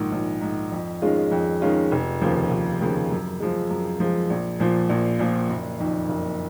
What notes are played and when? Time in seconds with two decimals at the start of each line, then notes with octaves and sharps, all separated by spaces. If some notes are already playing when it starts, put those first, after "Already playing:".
Already playing: A#1 G#2 D#3
0.12 A#1
0.41 G#2 D#3
0.72 F2
1.02 D#3 G#3 C#4 F4
1.31 F2
1.62 D#3 G#3 C#4 F4
1.92 F1
2.21 D#2 C#3 F3
2.51 F1
2.81 D#2 C#3 F3
3.11 F#2
3.40 F3 G#3
3.70 F#2
4.00 F3 G#3
4.30 A#1
4.60 A#2 F3
4.89 A#1
5.19 A#2 F3
5.49 F#1
5.79 F2 D#3
6.09 F#1